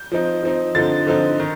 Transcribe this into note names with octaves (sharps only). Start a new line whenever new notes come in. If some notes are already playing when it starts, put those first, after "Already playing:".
Already playing: G6
F3 C4 D#4
F3 C4 D#4
D3 F3 C4 D#4 A6
D3 F3 C4 D#4
D#3